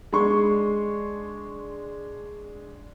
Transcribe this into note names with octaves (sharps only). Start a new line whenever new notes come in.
G#3 D4 C6 C#6